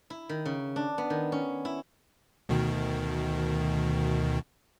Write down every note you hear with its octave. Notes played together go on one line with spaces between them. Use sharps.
E4
D#3
C#3
D4
B3
D#3
C#4
E4
D2 B2 D#3